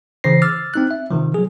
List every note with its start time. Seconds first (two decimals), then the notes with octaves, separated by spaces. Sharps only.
0.24 C#3 E3 C5 A#6 C7
0.42 D6 E6 F6 A6
0.74 C4 D#4 F#6
0.91 E5
1.11 C3 D#3 F3
1.34 F#3 G#4